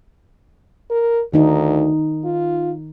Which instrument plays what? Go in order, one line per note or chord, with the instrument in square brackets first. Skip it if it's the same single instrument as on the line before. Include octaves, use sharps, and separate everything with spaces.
[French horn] A#4
[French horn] D2 [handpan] D#3 D#4
[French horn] F4